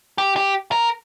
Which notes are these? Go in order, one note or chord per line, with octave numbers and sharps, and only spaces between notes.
G4
G4
A#4